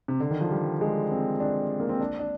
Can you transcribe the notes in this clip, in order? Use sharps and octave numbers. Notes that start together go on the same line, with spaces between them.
C3
D3
D#3
F3
G3
G#3
C4
D4
A#3
C4
D4
D4